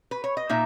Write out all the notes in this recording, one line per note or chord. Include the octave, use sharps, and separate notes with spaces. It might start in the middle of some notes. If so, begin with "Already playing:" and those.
B4
C#5
D#5
A#2 A#3 D#4 E5